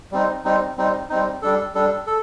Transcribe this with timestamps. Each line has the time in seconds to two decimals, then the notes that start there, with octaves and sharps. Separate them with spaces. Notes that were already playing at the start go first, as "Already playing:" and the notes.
0.12 G3 C4 D#4
0.45 G3 C4 D#4
0.77 G3 C4 D#4
1.09 G3 C4 D#4
1.42 G3 D4 A4
1.75 G3 D4 A4
2.07 A4